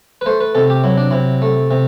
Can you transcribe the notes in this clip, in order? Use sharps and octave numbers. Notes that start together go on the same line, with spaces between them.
B4
A3 C5
B4
C3 A4
G4
F#3 E4
D4
C3 E4
A3
C3